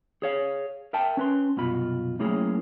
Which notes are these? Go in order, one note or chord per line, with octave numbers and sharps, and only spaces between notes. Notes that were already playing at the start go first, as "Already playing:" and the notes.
G#4 C#5 F5
A#4 E5 G5 A5
C#4 B4 C6
C2 F#2 B2 F4 B5
F#3 A3 A#3 C#4 E4 G#4